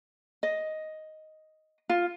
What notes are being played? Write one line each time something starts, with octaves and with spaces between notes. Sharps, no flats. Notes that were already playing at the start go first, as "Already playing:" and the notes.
D#5
F4